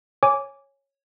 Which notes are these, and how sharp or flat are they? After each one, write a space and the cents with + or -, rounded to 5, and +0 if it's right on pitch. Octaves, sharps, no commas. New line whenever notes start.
C#5 -10 G#5 +0 D6 -15